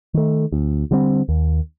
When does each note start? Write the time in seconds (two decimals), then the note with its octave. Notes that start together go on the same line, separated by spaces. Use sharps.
0.14 D#3 A3
0.52 D2
0.91 D3 G3 C4
1.29 D#2